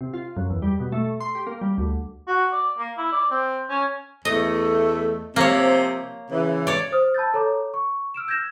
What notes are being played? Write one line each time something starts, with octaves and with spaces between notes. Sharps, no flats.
C3
F4
F#2
E2
G3
B2
A3
C6
G4
A#3
G3
D2
F#4
D5
A#3
E4
D5
C4
C#4
E2 A3 D#5
C3 F3 A#3 C4 C#5
C#3 E3
C#5 D5
C5 D#6 F6
A5 B5 E6 G6 A6
A4 C#5 A#5 D6
C#6
E6 F6 D7 E7
E6 G6 G#6 A#6 E7